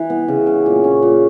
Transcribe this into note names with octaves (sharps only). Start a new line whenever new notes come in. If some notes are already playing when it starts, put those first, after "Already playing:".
Already playing: E3
B3
C#3
C#4
A#2
C#4
A#2